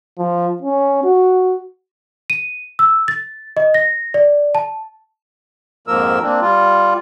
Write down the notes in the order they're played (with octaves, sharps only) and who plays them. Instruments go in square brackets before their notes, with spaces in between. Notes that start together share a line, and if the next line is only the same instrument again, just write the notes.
[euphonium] F3
C#4
F#4
[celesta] D#7
E6
A6
D#5
A#6
D5
A5
[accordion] F2 G#2 F3 A#3 A#4 E6
A#3 C4 D4
G3 F4